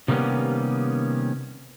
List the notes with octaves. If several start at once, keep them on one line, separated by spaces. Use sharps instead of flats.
C3 D#3 G3 A#3 B3 C#4